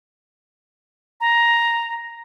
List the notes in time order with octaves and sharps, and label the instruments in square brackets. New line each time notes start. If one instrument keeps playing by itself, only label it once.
[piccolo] A#5